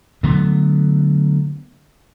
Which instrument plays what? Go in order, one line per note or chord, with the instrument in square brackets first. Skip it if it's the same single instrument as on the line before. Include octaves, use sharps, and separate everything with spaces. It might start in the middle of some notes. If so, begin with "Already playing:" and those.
[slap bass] D3 F#3 A3 B3